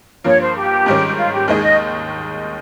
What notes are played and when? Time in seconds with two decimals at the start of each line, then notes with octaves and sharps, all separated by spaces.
0.24 G2 F3 A#3 C#5
0.40 C5
0.56 G4
0.86 G#2 D#3 G3 C#4
1.16 F4
1.32 G4
1.48 D#2 D#3 G#3 D#4 G#4
1.62 D#5